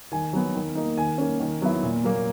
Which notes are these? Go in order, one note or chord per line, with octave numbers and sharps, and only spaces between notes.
D#3 G#5
F#3 B3
D#3
A#3 D#4
D#3 G#5
A#3 C#4
D#3
F#3 B3 E4
A#2
F#3 A#3